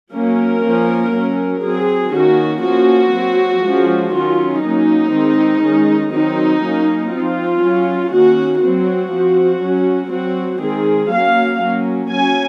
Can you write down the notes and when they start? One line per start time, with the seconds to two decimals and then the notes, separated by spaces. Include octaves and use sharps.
0.13 F#3 A#3 C#4 A#4
0.63 F3 A#3 C#4
1.14 F#3 C#4
1.63 F#3 C4 G#4
2.13 D#3 A#3 C#4 F#4
2.63 F3 A#3 C#4 F#4
3.13 F#3 C4
3.63 F3 G#3 C#4
4.12 D#3 F#3 C#4 F4
4.62 F#3 A#3 C#4 D#4
5.12 D#3 G#3 C4
5.63 D#3 G#3 C#4
6.12 D#3 F#3 C4 D#4
6.62 F#3 A#3 C#4
7.12 F3 C4 F4
7.61 F#3 C#4
8.12 D#3 A#3 C#4 F#4
8.61 F#3 C4 F#4
9.11 F3 C4
9.61 F#3 C#4
10.11 F#3 C4 F#4
10.61 D#3 G#3 C4 G#4
11.11 F#3 A#3 C#4 F5
11.61 F#3 A#3 C#4
12.11 F#3 C#4 G#5